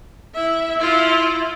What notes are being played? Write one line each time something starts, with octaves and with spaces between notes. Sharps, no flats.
E4 E5
E4 F4